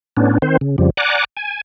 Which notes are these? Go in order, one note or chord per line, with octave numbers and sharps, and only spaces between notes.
A2 B3 C#4 D4
D#3 C4 C5
C#3
F2 C#3 F3 G3
D5 F#5 G#5 A#5 D6 F#6
G#5